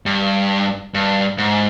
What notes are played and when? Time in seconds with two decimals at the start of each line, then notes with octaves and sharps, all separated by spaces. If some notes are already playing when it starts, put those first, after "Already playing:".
0.06 G2
0.94 G2
1.38 G#2